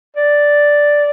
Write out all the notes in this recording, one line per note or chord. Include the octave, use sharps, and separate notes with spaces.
D5